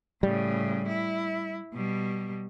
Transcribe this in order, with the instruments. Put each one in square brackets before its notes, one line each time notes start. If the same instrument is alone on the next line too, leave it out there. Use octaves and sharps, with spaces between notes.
[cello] A2 C#3 [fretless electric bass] G3
[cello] E4
B2 G3